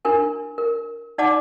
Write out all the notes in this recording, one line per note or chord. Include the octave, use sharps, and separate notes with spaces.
D4 E4 A#4 G#5
A#4
D#4 D5 F#5 A5 D6